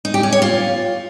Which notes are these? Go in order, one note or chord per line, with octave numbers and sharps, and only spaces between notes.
D#4
G4
C#4
C#5
F4